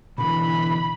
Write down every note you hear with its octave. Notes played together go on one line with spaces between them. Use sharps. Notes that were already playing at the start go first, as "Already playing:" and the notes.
B2 D3 E3 B5